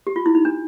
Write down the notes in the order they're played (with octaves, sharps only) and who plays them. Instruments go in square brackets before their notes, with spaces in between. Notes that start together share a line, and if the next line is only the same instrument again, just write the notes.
[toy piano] G4
F4
E4
D#4
D4